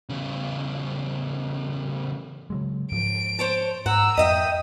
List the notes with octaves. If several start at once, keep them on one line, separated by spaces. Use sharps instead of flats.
E2 C#3
C#3 F#3 G#3
G#2 F3 D7
C5 C#5 A5
G#2 F#5 A#5 E6
F2 D#5 E5 G5 D#6